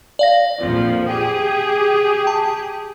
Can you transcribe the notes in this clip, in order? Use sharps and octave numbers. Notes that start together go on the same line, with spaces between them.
D5 F5 A#6
A#1 F2 F3
G4 G#4 G5
A5